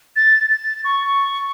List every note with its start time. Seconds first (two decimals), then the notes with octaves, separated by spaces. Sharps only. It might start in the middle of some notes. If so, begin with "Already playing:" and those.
0.16 A6
0.50 A6
0.85 C#6